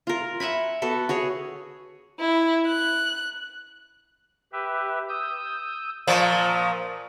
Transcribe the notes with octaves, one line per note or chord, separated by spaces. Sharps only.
F4 A#4
E5 F#5 G#5 B5
B3 F#4 A4 B4
F#4 G#4 C#5
E4
F#6
G4 B4 E5
D#6 E6 G6
A#2 F3 A#5 C#6 D#6